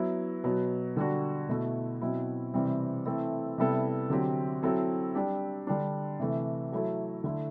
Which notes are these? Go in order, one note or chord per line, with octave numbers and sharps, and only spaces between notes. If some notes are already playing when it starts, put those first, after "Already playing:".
Already playing: F#3 B3 E4
B2 F#3 B3
D3 G3 D4 F#4
B2 A3 E4
B2 F#3 C4 E4
C3 E3 G3 C4
E3 A3 C4 E4 A4
C3 G3 B3 E4 A4
D3 F#3 C4 G4
F#3 C4 E4 A4
G3 D4 G4
D3 G3 D4
C3 E3 A3
F#3 A3 E4 A4
D3 A3 E4